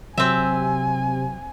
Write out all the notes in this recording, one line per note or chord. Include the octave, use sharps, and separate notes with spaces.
C3 F#3 C4 E5 G#5